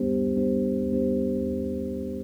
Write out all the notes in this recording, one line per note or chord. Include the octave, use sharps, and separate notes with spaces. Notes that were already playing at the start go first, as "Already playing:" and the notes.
Already playing: G3 B3 D4 G4 C5
G3 B3 D4 G4 C5
G3 B3 D4 G4 C5